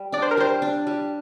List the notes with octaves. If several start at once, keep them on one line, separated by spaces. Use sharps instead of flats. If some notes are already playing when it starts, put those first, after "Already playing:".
Already playing: G3
D4 D5
C5
A#4
G3 C5
D4
G3